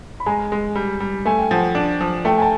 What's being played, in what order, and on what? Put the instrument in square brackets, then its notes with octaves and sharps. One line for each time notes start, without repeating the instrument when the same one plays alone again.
[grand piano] B5
[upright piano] G#3 [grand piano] G#5 A#5
[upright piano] G#3
G3
G3
[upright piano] A3 [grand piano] G#5
[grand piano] G5
[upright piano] F3 [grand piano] F#5 G#5
[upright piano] D4
F3
[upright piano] A3 [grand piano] G5 A5
[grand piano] G#5
G5 A5